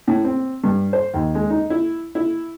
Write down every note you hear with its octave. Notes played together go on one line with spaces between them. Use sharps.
A2
C4
G2
C5
D#2
G#3
D#4
E4
E4